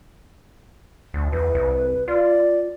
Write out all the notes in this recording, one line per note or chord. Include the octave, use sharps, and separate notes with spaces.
D2
E2 B4
C2
F4 D5